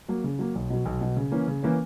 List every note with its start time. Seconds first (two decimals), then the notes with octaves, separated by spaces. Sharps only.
0.09 F#3 A#3
0.24 C#3
0.39 F#3 A#3
0.55 B1
0.70 B2 F#3
0.85 B1
1.01 B2 F#3
1.17 C#3
1.32 E3 A#3 C#4
1.48 C#3
1.63 E3 A#3 C#4